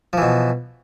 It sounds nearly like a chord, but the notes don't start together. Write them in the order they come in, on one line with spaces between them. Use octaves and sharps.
F3 E3 B2